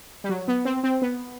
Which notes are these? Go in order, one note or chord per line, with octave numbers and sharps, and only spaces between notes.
G3
F#3
B3
C4
C4
B3